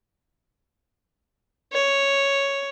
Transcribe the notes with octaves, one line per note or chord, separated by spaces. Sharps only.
C#5